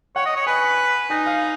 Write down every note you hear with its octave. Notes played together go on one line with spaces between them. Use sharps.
C#5 F#5
D#5
C#5
B4 G#5
D#4 G#5
F5